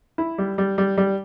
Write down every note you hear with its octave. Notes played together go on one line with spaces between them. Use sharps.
E4
G3
G3
G3
G3